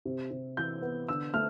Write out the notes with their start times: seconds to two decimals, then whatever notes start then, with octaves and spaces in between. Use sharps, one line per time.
0.05 C3
0.31 C3
0.57 E3 G6
0.82 B3
1.09 D3 E6
1.34 A3 F6